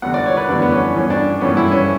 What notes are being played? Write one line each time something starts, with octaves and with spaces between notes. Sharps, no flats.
E2 D3 G3 B3 F#5
D5
C#5
B4
E2 D3 G3 B3 D4
B3
C#4
G2 E3 B3 C#4
D4
G2 E3 B3 C#4
E4
C#4